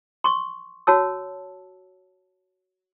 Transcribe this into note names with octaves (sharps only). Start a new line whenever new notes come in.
C6 C#6
F#4 C#5 A5 E6